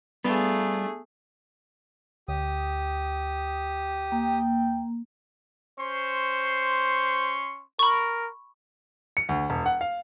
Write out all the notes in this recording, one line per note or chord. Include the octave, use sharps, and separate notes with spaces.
G3 A3 B3 D4 F4 G#4
D2 G4 D#6
A#3 G5
C#4 C5 C6 C#6
A#4 B5 C#6
C#7
D2
E1
F#5
F5